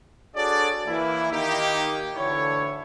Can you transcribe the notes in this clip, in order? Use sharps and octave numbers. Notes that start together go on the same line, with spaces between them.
D4 F#4 G#4 A4 C#5 D5
E3 A#3 E4
D#3 A#3 D#4 G4
D2 D3 E3 E4 C#5